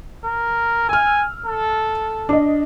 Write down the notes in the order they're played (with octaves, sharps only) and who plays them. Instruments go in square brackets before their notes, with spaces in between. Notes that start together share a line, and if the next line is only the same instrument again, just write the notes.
[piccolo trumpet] A#4
[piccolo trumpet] G#5 [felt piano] E6 F6
[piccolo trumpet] A4
[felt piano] D4 D#5